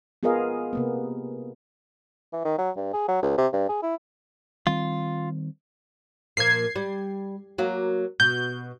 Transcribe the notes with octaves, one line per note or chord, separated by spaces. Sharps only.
B3 F4 G#4 A#4 D#5 F5
C3 A#3 B3
E3
D#3
F#3
G2
G#4
F#3
C#2
C3
G2
G#4
E4
D#3 G3 C4 F4
A#2 F3 A#3 G#6 C7
G3
F#3 A#3
B2 G6